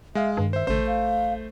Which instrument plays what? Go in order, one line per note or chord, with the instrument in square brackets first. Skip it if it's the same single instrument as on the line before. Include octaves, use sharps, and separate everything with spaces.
[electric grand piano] G#3 F5 [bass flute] E5
[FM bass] G2 [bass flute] D#3
[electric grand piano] C5 E5
[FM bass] A1 [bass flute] D3 [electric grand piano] A3 C5
[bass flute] F5